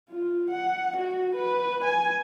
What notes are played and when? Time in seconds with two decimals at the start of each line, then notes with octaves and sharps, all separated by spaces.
0.10 F4
0.51 F#5
0.97 F#4
1.36 B4
1.85 G#5